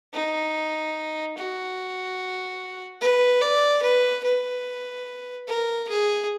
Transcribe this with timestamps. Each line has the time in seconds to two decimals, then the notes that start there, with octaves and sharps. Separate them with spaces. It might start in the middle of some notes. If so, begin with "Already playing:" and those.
0.14 D#4
1.37 F#4
3.01 B4
3.42 D5
3.83 B4
4.24 B4
5.48 A#4
5.89 G#4